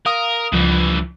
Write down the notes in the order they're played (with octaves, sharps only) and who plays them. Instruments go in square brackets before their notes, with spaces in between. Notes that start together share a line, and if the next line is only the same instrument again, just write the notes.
[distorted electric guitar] A#4 [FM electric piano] F5 D#6
[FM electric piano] C#2 F3 [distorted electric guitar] G2 E3